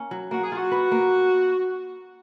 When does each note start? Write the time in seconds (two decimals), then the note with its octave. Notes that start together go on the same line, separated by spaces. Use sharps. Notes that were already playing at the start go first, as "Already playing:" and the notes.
Already playing: A#3 C#4
0.11 F#3
0.31 A#3 F#4
0.44 G#4
0.52 F4
0.57 F#4
0.71 B4
0.92 A#3